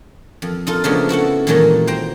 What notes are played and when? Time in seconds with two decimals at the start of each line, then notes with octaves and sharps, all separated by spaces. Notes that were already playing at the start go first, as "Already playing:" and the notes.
0.42 F2
0.67 D#4 F4 A4
0.84 C#3 F3 G#3 A3 B3 D4
1.09 E4 F#4 A4 F#5
1.47 A#2 D#3 E3 F#3 G#3 A3
1.87 C5 G5 A#5